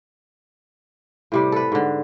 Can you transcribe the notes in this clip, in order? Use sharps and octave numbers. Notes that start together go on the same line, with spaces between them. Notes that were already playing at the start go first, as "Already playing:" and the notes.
A2 C3 G3
A4 B4
G#2 D3